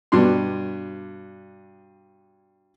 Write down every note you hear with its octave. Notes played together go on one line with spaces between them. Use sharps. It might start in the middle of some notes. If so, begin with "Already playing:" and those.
G2 B2 D4 C6